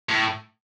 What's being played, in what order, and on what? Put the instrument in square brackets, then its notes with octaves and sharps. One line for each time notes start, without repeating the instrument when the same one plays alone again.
[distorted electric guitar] A2